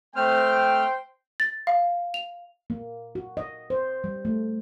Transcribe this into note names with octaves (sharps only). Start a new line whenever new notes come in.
A3 C4 C5 G5 F6
A6
F5
F7
A#3
F#4
D#5
C5
G3
A3